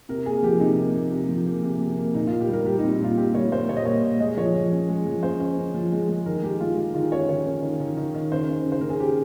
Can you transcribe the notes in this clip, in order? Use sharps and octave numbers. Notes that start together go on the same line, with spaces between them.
C3 A#4
A#3 G#4
F3 G4
C3 D#4
A#3
A#3
C3
F3
A#3
C3
C3
A#3
A#2 D#4
A#2 F4
G4
G3 A#4
G3 G4
D#4
C4
D#4
A#2 F4
C4 G4
G3 C#5
G3 C5
A#2 C#5
D#5
A#2 C#5
A#2
G#3 D#5
F3 C#5
F3
C#4
G#3
F3
C#4 C5
C#4
C#4
F3
G#3
G#3
D#3 A#4
G#3 G4
G#3 F4
G#3
D#3 F4
C#4 C#5
D#3 C#5
C#4
D#3
D#3
D#3
D#3
C#3 C5
C#4
C#3
C5
C#3 A#4
G#4
C#3 G4